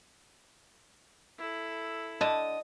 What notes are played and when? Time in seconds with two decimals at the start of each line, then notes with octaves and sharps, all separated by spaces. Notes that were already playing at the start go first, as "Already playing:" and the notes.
1.38 E4 A4
2.21 D3 D#5 A5